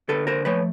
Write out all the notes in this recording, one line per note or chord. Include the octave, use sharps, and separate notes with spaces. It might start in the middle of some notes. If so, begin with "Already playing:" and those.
D3 A4 B4
A#4 C5
F3 A3 B4 C#5